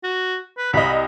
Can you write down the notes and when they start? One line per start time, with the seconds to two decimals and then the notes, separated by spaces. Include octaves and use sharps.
0.03 F#4
0.58 B4
0.73 C2 D#5 B5